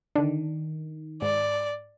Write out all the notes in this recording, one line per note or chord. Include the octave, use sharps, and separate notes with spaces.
D3 D#3 D4
G#2 D5